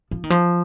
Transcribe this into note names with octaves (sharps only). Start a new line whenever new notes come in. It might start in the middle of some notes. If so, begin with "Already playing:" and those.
F3
D#3
F3